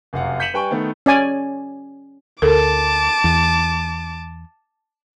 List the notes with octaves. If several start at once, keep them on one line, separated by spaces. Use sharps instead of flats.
F1 F#2 F5 F#5
G6 B6 C#7 D#7 E7 F#7
G3 B4 G5 G#5 C#6 D7
D#3 A3 B3
C#4 D5 G#5
D2 A4 A#4 A5 D6
E2